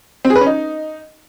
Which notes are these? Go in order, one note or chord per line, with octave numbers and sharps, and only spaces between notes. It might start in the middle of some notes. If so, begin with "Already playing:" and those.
C4
G#4
B4
C#4
D#4